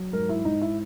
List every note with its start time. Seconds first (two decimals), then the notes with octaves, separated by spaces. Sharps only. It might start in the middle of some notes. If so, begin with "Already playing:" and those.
Already playing: F#3
0.13 G#2 A#4
0.29 E4
0.45 G#2 D#4
0.62 E4